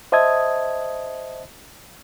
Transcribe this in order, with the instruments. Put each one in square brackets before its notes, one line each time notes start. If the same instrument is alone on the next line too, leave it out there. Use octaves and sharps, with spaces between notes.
[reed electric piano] C5 D#5 E5 A5 D#6 G#6